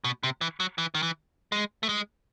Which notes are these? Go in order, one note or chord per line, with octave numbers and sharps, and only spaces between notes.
B2
C3
E3
F#3
E3
D#3
E3
G#3
A3
G#3